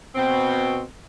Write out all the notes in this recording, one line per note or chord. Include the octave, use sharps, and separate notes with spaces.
B2 C4